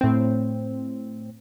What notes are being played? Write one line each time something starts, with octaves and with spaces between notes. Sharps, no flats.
A2 C4